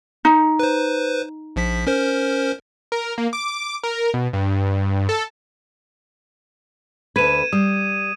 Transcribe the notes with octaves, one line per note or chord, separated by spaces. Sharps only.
D#4
B4 C5
A#1 F3 B6
C#4 A#4 C5
A#4
A#3
D6
A#4
B2
G2
A4
D2 B4 G#6 D#7 E7
G3 D#6